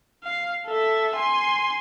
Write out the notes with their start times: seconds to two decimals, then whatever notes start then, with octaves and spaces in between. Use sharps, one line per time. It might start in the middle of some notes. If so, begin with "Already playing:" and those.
0.23 F5
0.66 A4 E5
1.15 G#5 C6